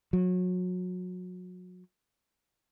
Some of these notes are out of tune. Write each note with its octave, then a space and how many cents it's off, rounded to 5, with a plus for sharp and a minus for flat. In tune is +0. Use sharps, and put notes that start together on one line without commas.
F#3 -30